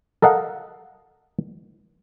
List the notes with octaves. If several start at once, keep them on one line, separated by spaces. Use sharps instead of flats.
A4 A#4 D#5 F5 F#5